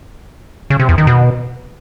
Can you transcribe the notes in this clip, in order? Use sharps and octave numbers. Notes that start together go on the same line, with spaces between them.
C#3
C3
E2
D#3
B2